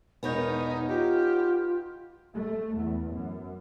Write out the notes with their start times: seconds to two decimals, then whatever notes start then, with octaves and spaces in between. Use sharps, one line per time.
0.23 E1 B3 D#4 A#4 C#5 G6
0.88 D#4 F4 G4
2.32 A3
2.74 E2
3.10 F#2